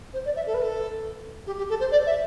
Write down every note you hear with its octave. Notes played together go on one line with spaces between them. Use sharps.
C5
D5
E5
A4
B4
A4
G4
G4
A4
C5
D5
E5